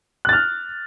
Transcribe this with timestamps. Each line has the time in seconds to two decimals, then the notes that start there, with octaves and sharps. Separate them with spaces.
0.25 F#6
0.29 A6
0.33 F6